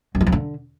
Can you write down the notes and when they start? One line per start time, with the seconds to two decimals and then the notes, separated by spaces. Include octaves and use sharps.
0.15 F#2
0.21 F3
0.27 F2
0.32 D3